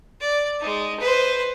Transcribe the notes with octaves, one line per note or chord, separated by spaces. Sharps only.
D5
G#3 D#4
B4 C5